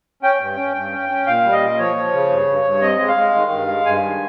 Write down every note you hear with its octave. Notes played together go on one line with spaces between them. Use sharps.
C#4 G5
G2
C#4
G2
C#4
C#4
A#2 F5
G3
D#5
A#2
F3 C#5
F3
C#3
G2
G2
G2
C4 D#5
G#3
F5
G#3
D#3
G2
G#3
G2 G#5
D#3